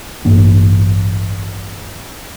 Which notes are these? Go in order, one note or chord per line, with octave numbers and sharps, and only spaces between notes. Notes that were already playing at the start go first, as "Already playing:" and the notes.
A1 G2 A#3 D4